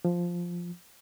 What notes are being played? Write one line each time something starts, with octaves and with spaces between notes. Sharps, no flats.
F3